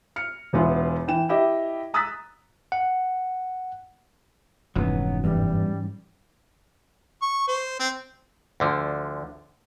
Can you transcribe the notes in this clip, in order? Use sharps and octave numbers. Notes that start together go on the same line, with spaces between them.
F6 C#7
E1 E2 E3 B3 F4 E5
E3 G5 E7
E4 G4 D#5 E5
A#5 D#6 E6 F#6 A6 B6
F#5
F1 G#2 E3 F#3 B3 C#4
E2 G2 G3
C#6
C5
C4
D2 D3 F3